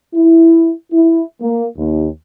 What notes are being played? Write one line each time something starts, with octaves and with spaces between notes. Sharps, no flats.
E4
E4
A#3
D#2